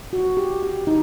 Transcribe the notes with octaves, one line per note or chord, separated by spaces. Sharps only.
F#4
G4
G4
D#4